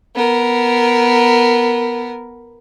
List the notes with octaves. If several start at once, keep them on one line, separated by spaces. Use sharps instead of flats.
B3 A#4